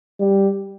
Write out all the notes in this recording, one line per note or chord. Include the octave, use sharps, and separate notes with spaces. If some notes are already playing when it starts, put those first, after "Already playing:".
G3